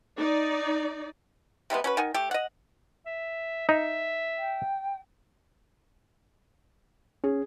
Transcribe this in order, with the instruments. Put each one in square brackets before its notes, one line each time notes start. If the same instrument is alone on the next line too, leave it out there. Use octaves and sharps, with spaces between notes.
[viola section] D#4 D5
[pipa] C3 G3 G#3 B3
C#4 F#4 B4
D#3 F#5 G#5
A3 G4
D#5 F#5
[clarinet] E5
[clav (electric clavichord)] D#4 [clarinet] E5
[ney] G5
[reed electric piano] C#4 [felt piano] G#4